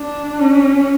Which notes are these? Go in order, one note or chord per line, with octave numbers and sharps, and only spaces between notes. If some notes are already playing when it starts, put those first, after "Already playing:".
Already playing: D4
C#4